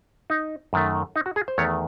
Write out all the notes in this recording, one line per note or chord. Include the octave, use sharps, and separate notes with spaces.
D#4
F#2 D#3 A3
D#4
F#4
G#4
C5
E2 D#3 A3 C#5